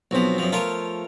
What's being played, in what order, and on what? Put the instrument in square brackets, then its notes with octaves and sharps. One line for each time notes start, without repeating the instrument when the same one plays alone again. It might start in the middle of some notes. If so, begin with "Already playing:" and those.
[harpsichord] B1 F3 [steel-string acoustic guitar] B3 C4 F#4
[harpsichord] F#2 F3
[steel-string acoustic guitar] F3 A3 [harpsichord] F4 A#4 C#5